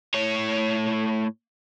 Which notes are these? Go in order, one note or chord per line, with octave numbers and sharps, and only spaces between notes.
A2 C#5